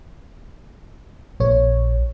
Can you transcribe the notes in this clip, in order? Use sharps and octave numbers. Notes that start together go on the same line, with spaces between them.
A#1 C#5